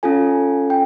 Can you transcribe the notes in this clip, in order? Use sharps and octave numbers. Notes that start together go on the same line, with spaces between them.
C#4 F4 A4 G#5
G5